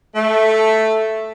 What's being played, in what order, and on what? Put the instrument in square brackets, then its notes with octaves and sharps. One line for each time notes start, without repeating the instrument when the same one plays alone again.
[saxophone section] A3